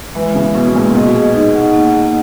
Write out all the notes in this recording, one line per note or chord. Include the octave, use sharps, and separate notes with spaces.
E3 G#3
C#3 G#3
B2 G#4
A#2 G#4
B2 D#5
G#4
D#4
F#5
A#3
A#3